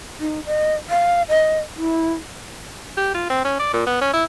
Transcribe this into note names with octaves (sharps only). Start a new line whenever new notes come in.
D#4
D#5
F5
D#5
E4
G4
F4
C4
C#4
D5
A#2
B3
C#4
E4